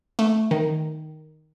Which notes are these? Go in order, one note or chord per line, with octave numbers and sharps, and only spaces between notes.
A3
D#3